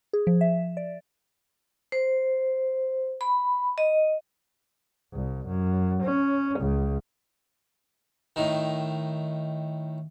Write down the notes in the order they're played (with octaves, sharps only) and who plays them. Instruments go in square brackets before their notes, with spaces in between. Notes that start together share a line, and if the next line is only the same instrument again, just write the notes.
[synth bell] G#4
F3
E5
D5
[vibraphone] C5
B5
D#5
[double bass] C2
F#2
C#4
C#2
[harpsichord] A2 D#3